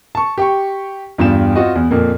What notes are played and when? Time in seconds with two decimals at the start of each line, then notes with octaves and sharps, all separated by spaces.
0.15 A5 C#6
0.38 G4 G5 C#6
1.18 E2 G2 F4 G5 E7
1.56 C4 F4 F#4 D#5
1.75 E2
1.91 F2 A#2 A#3